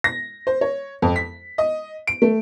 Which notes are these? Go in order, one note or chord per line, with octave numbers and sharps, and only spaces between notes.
A#6
C5
C#5
F2
B6
D#5
D7
A3